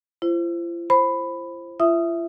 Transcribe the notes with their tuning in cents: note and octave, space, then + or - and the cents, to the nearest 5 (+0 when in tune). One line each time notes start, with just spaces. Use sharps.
F4 -45 C5 +0
C5 +15 B5 +10
F4 -45 E5 +0 D#6 +0